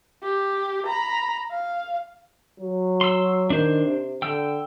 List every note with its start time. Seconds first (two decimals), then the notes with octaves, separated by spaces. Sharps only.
0.22 G4
0.86 A#5 B5
1.51 F5
2.60 F#3
3.01 C6 E6
3.50 D#3 D4 C5
3.85 C3
4.22 D3 G5 E6